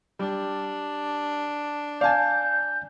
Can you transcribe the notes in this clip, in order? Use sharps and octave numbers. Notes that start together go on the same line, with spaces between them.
G3 D4
D5 F5 G#5 A5 G6